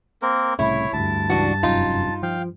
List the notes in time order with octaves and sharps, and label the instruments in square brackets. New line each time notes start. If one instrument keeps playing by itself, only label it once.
[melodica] A#3 C4 A#4
[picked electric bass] C2 A2 C#3 [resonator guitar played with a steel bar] E4 [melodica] C#5
[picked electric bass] D2 [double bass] G2 [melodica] A5
[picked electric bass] C#2 E3 [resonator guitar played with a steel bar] D4 F#4
[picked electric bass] F1 F#2 [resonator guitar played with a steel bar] D#4 F4
[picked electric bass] F3 [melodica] F5 G5